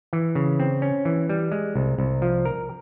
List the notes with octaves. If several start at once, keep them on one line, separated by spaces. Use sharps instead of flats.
E3
C#3
C4
C#4
E3
G3
G#3
C2
C2
F3
A#4